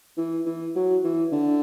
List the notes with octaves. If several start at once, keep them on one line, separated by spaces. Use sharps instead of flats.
E3
E3
F#3
E3
D3